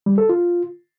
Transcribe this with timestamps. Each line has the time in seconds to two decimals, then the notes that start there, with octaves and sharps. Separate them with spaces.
0.06 G3
0.18 A4
0.29 F4